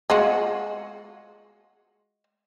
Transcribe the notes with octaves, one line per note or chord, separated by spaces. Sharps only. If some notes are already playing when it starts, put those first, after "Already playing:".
G#3 F4 F#4